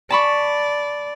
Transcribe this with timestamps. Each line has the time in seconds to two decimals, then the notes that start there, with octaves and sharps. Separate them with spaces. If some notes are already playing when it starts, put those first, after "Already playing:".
0.10 D5 A5 B5 C#6